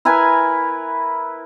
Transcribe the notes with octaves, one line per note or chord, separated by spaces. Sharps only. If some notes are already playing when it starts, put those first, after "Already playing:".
E4 A#4 B4 G#5